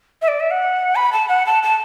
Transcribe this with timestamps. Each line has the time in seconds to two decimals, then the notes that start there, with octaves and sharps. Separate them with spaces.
0.22 E5
0.28 D5
0.40 E5
0.51 F#5
0.96 B5
1.13 A5
1.28 F#5
1.46 A5
1.63 A5